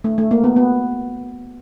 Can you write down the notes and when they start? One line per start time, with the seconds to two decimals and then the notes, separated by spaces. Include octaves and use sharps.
0.04 A3
0.18 A3
0.31 A#3
0.44 B3
0.56 B3